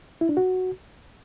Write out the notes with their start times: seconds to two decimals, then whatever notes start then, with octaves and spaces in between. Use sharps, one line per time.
0.21 E4
0.29 D4
0.37 F#4